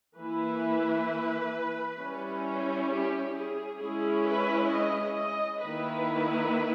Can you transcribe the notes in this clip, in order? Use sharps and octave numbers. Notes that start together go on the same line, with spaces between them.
E3 A#3 E4 B4
G3 C#4 E4
G4
G#4
G#3 C#4 E4 G#4
B4
D#5
D#5
D#3 A#3 E4 B4